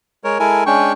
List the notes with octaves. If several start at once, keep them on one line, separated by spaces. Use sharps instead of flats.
G#3 A#4 C#5
G#3 E4 A4 A#4 G#5
G#3 C#4 D4 G5 C#6